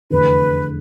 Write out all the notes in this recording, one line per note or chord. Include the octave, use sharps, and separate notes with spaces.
F1 E2 D3 B4